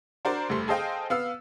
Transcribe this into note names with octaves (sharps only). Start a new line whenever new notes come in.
D4 F#4 A#4 C5 D5
F1 G2 C3 A3 C6
G#4 A4 C5 D#5 F5 G5
B3 F5 E6